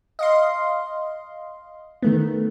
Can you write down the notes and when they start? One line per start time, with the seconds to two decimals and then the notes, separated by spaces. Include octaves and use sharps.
0.19 D#5 F5 C6
2.03 D#3 A3 B3